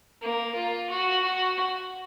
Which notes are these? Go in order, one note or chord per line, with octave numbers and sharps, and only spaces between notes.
A#3
F4
F#4
F#4